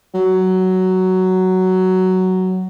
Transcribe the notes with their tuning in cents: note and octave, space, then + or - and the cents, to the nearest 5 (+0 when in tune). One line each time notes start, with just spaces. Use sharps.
F#3 +10